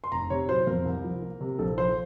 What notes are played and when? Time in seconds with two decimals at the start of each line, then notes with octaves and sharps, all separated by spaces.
0.04 C6
0.11 F1 A#5
0.30 C3 C#5
0.49 F#3 C5
0.67 F2 A#4
0.85 C2
1.04 F3
1.22 A#3
1.41 C3
1.59 A#1 A4
1.77 F3 C5